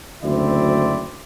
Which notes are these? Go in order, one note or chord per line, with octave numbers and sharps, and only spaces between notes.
F#1 D2 C4 E4 D5